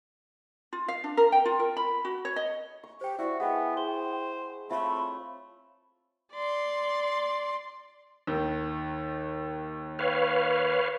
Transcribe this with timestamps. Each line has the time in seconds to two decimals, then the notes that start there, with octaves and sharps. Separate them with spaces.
0.73 F4
0.88 F5
1.04 D4
1.17 A#4
1.32 G5
1.45 F4
1.60 A#4
1.77 B5
2.05 F#4
2.25 C#5
2.36 D#5
2.83 C#6
3.01 G4 C5 G5
3.18 E4 F#4 D5 F#5
3.40 G#3 B3 F#5 G5
3.76 G#4 C5 G7
4.71 A3 C4 F4 C#5 E5 F5 B5
6.32 D5 C6
8.27 D#2 D#3
9.99 B4 C#5 F5